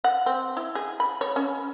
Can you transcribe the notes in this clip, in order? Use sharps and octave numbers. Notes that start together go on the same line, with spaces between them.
F#5
C4
E4
G#4
B5
C#5
C#4